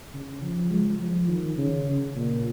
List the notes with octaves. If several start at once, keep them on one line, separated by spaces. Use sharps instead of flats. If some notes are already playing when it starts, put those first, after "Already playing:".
C#3
F3
G#3
F3
D#3
C#3
A#2